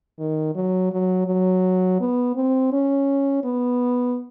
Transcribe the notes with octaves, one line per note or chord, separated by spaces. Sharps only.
D#3
F#3
F#3
F#3
B3
C4
C#4
B3